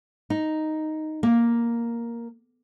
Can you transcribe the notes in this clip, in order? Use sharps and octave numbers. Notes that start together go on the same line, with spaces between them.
D#4
A#3